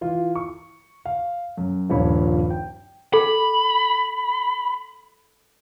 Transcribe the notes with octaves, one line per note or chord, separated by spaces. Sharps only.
E3 F4
C#6
F5
F#2
D#1 G2 A#2 F3 C#5 B5
G5
A4 B5